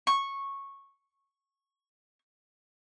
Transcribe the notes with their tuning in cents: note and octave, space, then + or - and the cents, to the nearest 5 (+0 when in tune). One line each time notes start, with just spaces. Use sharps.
C#6 -10